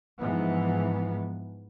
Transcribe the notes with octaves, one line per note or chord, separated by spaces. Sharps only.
G#2 E3 F3 B3